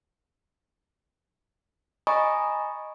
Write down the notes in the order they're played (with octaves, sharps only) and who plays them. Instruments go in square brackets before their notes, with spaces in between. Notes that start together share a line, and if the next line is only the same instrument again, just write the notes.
[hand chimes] D#5 G#5 A#5 B5 C#6 D#6